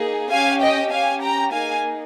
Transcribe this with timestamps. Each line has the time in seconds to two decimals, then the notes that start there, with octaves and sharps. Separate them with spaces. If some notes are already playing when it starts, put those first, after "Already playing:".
Already playing: A#3 D#4 G#4
0.31 C#4 G4 F5 G#5
0.61 D#5 G5
0.92 C#4 G4 F5 G#5
1.22 G5 A#5
1.52 A#3 D#4 G#4 F5 G#5